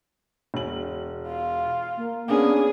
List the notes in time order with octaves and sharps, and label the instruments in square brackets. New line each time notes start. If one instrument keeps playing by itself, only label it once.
[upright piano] E1 F#7
[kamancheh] F4
[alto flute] A#3
[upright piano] A#3 B3 C#4 [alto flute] D4 [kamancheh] G#4